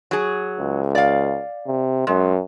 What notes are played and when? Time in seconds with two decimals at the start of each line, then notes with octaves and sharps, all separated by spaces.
0.11 F#3 G#4
0.59 C#2
0.95 D5 F5
1.66 C3
2.07 F#2 G#3